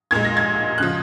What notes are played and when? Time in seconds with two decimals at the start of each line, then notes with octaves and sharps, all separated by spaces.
0.11 A#2 G#3 G#6
0.25 A#6
0.37 G#6
0.78 C#3 F3 F#6